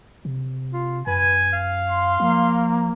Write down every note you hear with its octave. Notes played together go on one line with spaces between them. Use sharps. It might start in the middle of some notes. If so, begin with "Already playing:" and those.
C3
F4
F#2 B4 G#5
F5
C6
F3 A#3